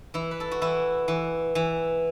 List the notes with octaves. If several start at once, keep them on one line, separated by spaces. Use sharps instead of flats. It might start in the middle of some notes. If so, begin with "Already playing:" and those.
E3 E4
B4
A4
F#4
E3 E4
E3
E3